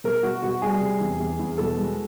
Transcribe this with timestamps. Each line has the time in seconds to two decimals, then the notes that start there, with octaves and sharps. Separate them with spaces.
0.04 B2 A#4
0.23 B2 F#4
0.42 B2 F#4
0.62 G3 G#4
0.81 C3
1.01 E2
1.20 E2
1.39 E2
1.58 B2 A4
1.77 G#3